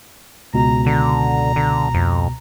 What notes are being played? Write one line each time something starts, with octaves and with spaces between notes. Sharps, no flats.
C#2 B2 A#5
D3 A#5
D3
F2